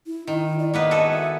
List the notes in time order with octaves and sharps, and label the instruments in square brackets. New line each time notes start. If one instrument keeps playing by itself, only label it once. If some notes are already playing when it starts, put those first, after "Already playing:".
[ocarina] E4
[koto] D#3 [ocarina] E4
[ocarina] D5
[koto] A#3 B3 B4 [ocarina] D#5
[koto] F#4 G#4 A4
[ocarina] E5